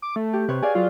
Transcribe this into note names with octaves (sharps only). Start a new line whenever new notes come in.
D6
A3
G4
C3 B4 C#5
G#4 D5 F5 G#5
F#3 F4